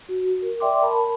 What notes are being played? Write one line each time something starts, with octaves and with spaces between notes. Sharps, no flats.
F#4
A#4
D5 E5 G5 C6 D6
A#4 A5 B5